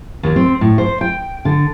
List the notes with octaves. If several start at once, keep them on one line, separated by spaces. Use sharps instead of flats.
D#2
C4
A2
C5
G5
D3